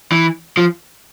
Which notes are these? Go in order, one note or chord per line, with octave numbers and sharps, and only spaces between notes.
E3
F3